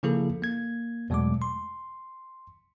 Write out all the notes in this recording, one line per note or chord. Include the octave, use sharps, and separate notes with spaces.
C#3 F3 A#3 E4 G#4 A4
A#3 G#6
E2 B2 F#3 G#3 A3 D6
C6